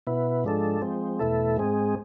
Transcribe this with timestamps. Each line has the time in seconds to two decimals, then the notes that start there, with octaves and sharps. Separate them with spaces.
0.07 B2 B3 E4
0.44 G#2 F3 G#3 D4 A4
0.82 F3 G#3 C4
1.19 E2 B2 A3 E4 A4
1.57 G#2 G#3 C4 G#4